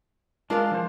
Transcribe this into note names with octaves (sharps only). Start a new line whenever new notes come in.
G#3 D4 F4 A#4 F5
F3 C5